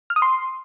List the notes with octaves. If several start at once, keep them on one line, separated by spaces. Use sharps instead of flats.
F6
D#6
C6